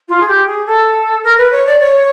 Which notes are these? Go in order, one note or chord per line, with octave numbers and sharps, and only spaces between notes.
F4
G#4
G4
G#4
A4
A#4
B4
C#5
D5
C#5